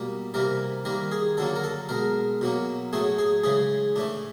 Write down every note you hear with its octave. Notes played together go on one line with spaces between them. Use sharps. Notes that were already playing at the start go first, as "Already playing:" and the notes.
Already playing: B2 G3 A#3
C3 E3 G3 A#3 A#4
D#3 G3 A#3 A#4
G#4
D3 F#3 A#3 A4
A#4
A4
B2 G#3 A#4
B2 F#3 A#3
A2 F#3 A3 G#4
G#4
C#3 E3 G#3 G#4
A2 E3 A3 D4